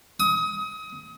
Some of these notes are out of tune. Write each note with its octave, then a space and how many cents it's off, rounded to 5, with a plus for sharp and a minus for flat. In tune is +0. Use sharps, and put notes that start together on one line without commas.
D#6 +30